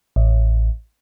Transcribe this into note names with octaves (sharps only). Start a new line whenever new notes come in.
A1